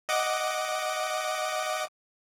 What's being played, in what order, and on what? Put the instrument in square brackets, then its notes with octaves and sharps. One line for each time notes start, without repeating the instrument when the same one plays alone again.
[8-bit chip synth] D#5 F#5 D6